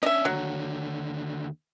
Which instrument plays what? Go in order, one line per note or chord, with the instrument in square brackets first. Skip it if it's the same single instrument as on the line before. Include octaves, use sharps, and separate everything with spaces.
[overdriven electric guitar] C#4 D4 [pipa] D#5 E5
[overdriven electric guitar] D#2 D3 [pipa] F#3